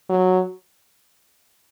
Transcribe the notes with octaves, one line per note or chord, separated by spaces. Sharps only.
F#3